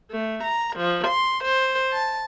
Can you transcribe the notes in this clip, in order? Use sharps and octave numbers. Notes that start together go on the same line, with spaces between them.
A3
A#5
F3
C6
C5
A5